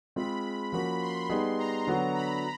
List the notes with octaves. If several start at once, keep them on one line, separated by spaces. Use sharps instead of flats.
G#3 C4 F4 G#4 B5
F3 A#3 C#4 F#4 B5
C6
G3 B3 D#4 G#4
A#5
D3 F#3 B3 D4 F#4
B5